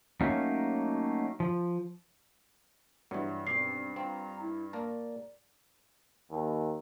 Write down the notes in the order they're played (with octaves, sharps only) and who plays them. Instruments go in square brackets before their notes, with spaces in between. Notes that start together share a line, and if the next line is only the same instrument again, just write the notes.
[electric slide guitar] F#3 A3 A#3 C#4 D#4
F3
[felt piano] G2 [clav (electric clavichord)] E3 F#3
[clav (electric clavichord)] B1 D5 [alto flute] C4 [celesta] C7
[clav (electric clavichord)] C4 F4 [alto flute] A#5
[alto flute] E4
[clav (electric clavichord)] A#3 A#4 A5 [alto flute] D5
[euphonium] D#2